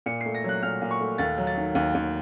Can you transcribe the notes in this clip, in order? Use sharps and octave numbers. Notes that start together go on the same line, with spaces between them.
A#2 C#7
C7
A3
A#6
F#3 F#6
A#2 F6
A#2
C#6
A3
D#2 A6
F#3
A6
D#3
D#2
D#2